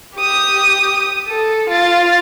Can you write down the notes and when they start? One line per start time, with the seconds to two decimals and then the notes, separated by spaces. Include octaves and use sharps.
0.16 G4 D#6
1.28 A4
1.69 F4 A6